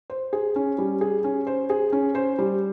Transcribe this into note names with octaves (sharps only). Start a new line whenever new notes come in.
C5
G#4
C#4
G3
G#4
C#4
C5
G#4
C#4
C5
G3